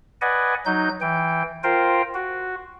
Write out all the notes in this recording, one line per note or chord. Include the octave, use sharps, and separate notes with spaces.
B4 D5 D#5 F#5 G#5
F#3 D#4 G6
E3 G5
F4 A#4 C5 G5
F#4